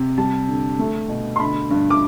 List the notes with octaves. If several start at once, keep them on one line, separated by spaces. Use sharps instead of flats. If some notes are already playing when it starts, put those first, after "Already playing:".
Already playing: C3
G3 A5
D3
A3
B2
C6
D3 B5
G2
D6